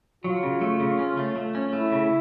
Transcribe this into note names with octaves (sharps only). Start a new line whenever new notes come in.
F#3 F4
C#3
A3
C#3
C#4
A3
A3
C#4
A3 E4
C#3